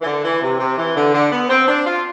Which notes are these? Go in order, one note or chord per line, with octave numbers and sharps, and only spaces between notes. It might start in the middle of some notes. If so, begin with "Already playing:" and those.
E3
D3
E3
C3
C3
E3
D3
D3
B3
C4
D4
F4